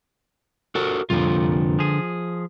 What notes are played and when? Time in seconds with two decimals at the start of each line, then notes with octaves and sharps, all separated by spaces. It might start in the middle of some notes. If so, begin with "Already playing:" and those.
0.75 F#4 A4 A#4
1.10 C2 F2 A#2 D3 F4
1.79 F3 G#4